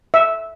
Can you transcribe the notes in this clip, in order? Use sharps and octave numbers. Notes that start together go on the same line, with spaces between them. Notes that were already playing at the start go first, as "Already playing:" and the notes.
E5